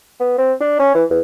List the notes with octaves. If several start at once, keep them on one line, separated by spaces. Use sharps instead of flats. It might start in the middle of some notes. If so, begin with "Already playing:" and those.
B3
C4
D4
C#4
E3
E2